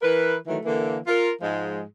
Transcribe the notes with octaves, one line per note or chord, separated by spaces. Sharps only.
E3 A#4 B4
D#3 E3 F#3 A3
D3 E3 A#3
F4 A#4
G#2 F3 G#3